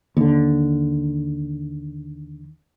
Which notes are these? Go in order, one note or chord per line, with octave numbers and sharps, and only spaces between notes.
D#2 D3